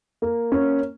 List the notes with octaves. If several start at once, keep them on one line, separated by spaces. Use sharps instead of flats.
A#3
C#4